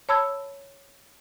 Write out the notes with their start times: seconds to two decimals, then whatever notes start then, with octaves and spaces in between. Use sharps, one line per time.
0.09 C#5 A5 B5 E6 G#6